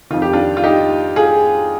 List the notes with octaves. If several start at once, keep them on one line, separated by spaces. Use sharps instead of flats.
F2 D#3 F4
G4
D4 F4
F4
D#4 G4
F4 G#4